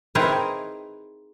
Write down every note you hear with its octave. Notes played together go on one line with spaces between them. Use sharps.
C4 D#4 E4 G#4 A#4 B4